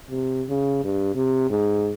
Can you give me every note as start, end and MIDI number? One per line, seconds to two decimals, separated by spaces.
0.11 0.44 48
0.49 0.82 49
0.84 1.10 43
1.15 1.45 48
1.50 1.92 44